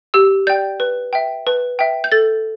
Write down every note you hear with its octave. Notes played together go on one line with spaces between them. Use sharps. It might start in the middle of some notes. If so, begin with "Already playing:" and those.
G4 E6
D5 G5 G6
B4
E5 G5
B4
E5 G5
G6
A4 A6